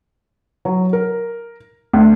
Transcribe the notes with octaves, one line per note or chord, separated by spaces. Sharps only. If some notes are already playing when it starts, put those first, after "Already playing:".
F#3
A#4
D2